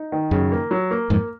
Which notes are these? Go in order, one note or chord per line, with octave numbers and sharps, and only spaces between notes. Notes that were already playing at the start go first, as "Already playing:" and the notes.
Already playing: D#4
D#3
F#2 C#3
A#3
F#3
A#3
F2 G#2 A#3